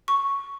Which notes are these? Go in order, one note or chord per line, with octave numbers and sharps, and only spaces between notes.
C#6